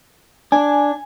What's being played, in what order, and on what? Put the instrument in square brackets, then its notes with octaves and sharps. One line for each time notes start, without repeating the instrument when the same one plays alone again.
[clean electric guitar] D4 [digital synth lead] G#5